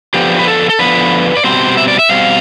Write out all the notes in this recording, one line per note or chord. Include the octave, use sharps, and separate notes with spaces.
D3 F3 B3 G4
B4
A4
A4
D3 F3 B3 B4
D5
B2 G3 C4 C5
E5
D5
E5
B2 G3 C4 F5